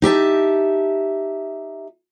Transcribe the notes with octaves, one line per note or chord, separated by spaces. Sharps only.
D#4 G4 E5 A5